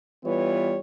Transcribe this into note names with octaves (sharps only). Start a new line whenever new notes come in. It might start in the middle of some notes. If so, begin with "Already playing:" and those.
E3 G3 B3 F4 C#5